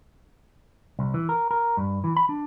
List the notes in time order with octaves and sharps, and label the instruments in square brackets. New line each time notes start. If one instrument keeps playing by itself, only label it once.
[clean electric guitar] C2
E3
A#4
A#4
G2
E3
B5
D4